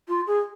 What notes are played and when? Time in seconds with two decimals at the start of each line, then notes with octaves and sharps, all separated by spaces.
0.08 F4
0.27 G#4